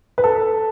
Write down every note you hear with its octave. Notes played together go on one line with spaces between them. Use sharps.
B4
A4